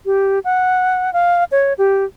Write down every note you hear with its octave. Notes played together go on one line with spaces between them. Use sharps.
G4
F#5
F5
C#5
G4